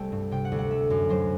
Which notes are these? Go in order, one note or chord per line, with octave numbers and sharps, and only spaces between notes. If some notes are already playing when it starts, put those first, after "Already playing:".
Already playing: C2 G3 A3 G5 A5
G2
C3 G5
F#5
D2
F#5
A3 E5
F#2
F#3 C5